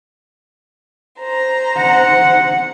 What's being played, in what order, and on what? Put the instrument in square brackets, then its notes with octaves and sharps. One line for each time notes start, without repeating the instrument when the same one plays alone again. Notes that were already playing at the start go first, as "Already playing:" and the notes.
[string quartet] C5 A#5
[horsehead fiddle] F#5